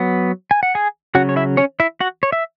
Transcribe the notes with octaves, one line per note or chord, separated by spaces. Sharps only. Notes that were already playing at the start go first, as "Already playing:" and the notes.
Already playing: F#3 B3
G#5
F#5
G#4 G#5
C#3 F#3 C#4 F#4 F#5
C#5
E4 E5
C#4 C#5
E4 E5
F#4 F#5
C#5
E5